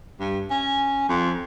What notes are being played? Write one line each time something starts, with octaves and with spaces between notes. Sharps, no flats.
G2
C#4
F2